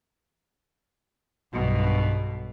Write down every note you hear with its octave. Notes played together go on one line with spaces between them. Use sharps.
B1 G2 B2